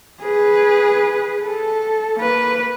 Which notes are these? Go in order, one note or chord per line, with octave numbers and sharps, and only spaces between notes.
G#4 B4
A4
A#3 B4